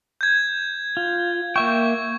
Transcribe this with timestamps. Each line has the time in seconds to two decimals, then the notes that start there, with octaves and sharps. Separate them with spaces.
0.21 G6 G#6
0.97 F4
1.56 A#3 E5 G5 C#6